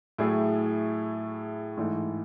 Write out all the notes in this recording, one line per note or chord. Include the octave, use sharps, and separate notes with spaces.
A2 F#3 A3 E4 G#4
G#2 E3 A3